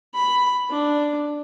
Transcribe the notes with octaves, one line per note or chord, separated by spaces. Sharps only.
B5
D4